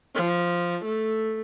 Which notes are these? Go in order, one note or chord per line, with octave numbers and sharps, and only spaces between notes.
F3
A3